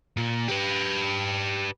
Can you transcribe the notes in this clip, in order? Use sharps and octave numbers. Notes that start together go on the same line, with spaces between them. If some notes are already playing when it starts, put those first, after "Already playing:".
A#2
G4 B4